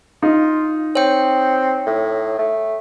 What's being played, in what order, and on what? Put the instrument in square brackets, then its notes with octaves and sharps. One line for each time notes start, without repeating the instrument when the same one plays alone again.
[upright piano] D#4 [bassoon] F4
[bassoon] C4 [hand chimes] C#5 G5
[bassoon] A2
A3